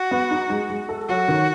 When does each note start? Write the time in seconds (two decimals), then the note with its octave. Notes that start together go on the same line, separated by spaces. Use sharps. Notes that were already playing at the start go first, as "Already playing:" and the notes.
Already playing: F#4
0.11 B3
0.31 D#4
0.50 G#3
0.70 G#3
0.89 A4
1.08 F#3 F#4
1.28 D#3